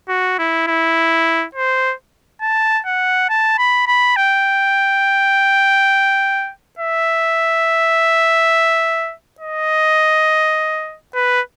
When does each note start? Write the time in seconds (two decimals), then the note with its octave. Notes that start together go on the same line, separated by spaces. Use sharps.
0.09 F#4
0.39 E4
0.67 E4
1.55 C5
2.42 A5
2.86 F#5
3.29 A5
3.58 B5
3.87 B5
4.16 G5
6.79 E5
9.40 D#5
11.15 B4